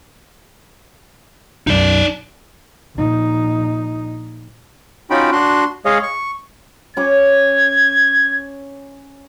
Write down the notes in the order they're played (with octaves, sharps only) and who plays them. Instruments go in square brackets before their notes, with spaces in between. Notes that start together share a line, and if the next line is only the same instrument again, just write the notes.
[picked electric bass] B1 F#2 [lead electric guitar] D#4 D5
[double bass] A#1 D#4
[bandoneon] C#4 D#4 F4 F#4 G5 B5
D4 F#4 C6 F#6
G#3 G#4 C#5 D#5 F5
C#6
[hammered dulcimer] C#4 C#6 D6 [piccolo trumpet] G#6